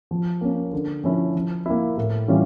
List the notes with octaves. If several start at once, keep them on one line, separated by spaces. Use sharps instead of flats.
F3
A#3 C#4
D3
F3 C#4 E4
F3
A#3 E4
A2
E3 G3 C#4 F4